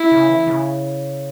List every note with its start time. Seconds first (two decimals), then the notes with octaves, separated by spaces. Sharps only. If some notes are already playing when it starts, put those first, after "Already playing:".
Already playing: E4
0.12 C#3
0.29 E3
0.47 C#3